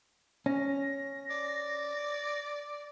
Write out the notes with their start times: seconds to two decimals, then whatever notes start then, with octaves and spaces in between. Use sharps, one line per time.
0.46 C#4 A#6
1.30 D5